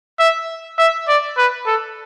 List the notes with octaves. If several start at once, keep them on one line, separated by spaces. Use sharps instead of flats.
E5
E5
D5
B4
A4